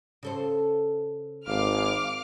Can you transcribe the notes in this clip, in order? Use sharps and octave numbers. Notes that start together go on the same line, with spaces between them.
C#3 A4 C5
G#1 F5 D6 F6